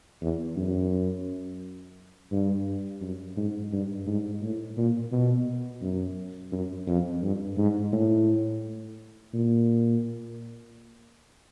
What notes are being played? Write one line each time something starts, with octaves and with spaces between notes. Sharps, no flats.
E2
F#2
G2
F#2
G#2
G2
G#2
A2
A#2
B2
F#2
F#2
F2
G2
G#2
A2
A#2